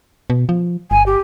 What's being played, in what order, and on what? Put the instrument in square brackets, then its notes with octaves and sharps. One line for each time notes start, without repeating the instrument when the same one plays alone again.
[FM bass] B2
F3
[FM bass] G1 [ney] G#5
[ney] G4